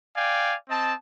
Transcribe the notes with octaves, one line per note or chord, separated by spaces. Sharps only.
D5 F5 G5 G#5
C4 D#5 A5